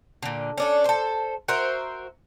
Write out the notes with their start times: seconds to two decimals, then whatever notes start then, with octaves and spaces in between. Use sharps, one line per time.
0.22 A#2 D3
0.58 C#4 D4 A4
0.85 A4 C5
1.48 F#4 A#4 C5 E5